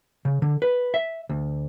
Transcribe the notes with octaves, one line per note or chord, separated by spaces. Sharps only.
C#3
D3
B4
E5
D2